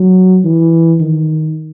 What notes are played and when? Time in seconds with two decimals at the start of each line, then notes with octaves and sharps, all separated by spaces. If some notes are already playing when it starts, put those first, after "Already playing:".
Already playing: F#3
0.45 E3
1.01 D#3